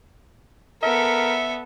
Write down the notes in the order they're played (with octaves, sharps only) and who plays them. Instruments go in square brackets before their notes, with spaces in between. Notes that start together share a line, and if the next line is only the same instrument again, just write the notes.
[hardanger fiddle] B3 A4 [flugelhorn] A#4 [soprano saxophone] E5